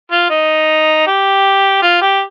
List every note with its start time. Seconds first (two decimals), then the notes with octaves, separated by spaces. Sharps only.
0.12 F4
0.30 D#4
1.07 G4
1.82 F4
2.01 G4